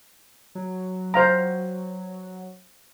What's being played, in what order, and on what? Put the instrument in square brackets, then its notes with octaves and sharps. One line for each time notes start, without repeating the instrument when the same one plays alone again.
[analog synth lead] F#3
[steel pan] C5 F5 A#5